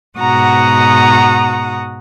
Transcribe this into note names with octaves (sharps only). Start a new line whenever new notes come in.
G#2 B2 F#4 F#5 A#5 D#6